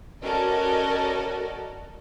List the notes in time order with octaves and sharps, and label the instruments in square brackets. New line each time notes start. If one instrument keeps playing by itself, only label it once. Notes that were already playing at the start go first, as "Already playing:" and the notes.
[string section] C#4 F#4 A4 A#4 D5 D#5